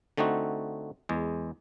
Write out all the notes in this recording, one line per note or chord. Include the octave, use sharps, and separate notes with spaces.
D3 A3 C4 D#4 F#4
E2 G#3